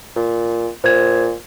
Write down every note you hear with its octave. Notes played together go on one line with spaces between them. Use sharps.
A#2
A#2 C5 G#6